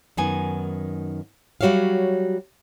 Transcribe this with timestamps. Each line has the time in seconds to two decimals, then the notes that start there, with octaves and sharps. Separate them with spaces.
0.17 F#2 D#3 B3 G#5
1.61 F#3 G3 F#4 C#5 E5 F5